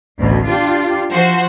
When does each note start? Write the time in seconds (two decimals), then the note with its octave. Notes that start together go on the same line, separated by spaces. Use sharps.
0.19 A1 D2 B2
0.48 D4 F4 G4
1.10 F3 F#4 C5